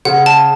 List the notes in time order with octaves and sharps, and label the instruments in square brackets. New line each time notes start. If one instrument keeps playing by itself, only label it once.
[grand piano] C#3 [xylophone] F#5
[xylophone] A5